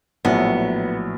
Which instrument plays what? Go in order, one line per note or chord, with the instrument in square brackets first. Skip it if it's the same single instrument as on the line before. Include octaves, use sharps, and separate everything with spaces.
[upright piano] A#1 A2 F#3 [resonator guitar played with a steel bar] B3